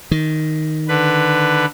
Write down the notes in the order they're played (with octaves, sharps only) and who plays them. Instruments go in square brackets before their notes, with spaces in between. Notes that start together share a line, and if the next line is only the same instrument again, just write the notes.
[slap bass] D#3
[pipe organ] D3 B4